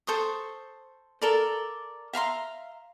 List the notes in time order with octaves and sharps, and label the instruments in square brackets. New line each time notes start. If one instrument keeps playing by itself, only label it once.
[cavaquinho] A4 C5 C#6 D#6
A4 A#4 D5
E5 F5 A#5 C6